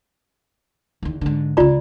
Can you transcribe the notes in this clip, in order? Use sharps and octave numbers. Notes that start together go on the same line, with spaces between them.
E2 D#3
G#2 D3
C#2 C#3 F4 D5 A#5